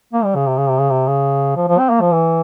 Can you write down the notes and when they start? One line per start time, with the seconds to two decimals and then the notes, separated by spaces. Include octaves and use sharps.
0.13 A#3
0.24 G3
0.35 C#3
0.47 C3
0.58 C#3
0.69 C3
0.79 C#3
0.91 C3
1.07 C#3
1.56 F3
1.68 F3
1.79 C4
1.90 A#3
2.01 F3
2.12 E3